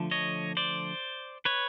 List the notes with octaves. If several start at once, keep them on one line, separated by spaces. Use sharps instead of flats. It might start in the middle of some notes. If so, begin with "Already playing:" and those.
Already playing: D3 F3 A3
C#5 D#5
C5 D5
B4 C#5